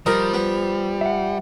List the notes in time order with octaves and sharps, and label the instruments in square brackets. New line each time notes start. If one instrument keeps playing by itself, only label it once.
[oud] F3 [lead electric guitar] G3 [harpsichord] D#4 A#4
[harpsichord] B3
[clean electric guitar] E5 F#5